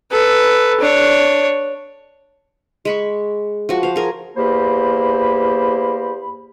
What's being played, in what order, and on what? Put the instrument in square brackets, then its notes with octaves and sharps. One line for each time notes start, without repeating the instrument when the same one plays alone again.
[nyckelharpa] A4 B4
D4 C#5
[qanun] G#3 B5 C#6
F3 F#4
C5 F5
G#4 A#4
[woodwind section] E2 A#3 G4 C5 B5